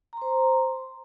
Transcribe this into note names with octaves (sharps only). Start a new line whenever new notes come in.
C5 A#5 C6